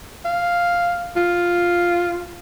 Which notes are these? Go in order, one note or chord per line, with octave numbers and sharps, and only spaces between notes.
F5
F4